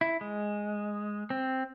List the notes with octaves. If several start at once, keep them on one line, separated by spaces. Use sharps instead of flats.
E4
G#3
C4